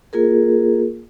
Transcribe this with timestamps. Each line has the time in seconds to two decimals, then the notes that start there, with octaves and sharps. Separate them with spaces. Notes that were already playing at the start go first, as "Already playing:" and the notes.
0.13 A#3 F4 G#4 A#4